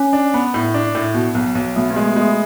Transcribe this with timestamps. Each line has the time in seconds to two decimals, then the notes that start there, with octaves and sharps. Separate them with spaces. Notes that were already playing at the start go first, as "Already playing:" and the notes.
Already playing: C#4
0.13 D4
0.34 B3
0.54 A2
0.74 D4
0.95 A2
1.14 B2
1.35 B1
1.55 B1
1.76 B2 A3
1.90 B3
1.96 G#3
2.06 A3
2.16 G#3
2.22 A3